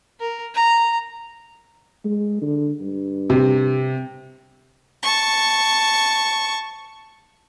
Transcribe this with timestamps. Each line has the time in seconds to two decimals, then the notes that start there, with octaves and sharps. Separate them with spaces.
0.20 A#4
0.54 A#5
2.05 G#3
2.42 D3
2.81 G2
3.30 C3
5.03 A5 C#6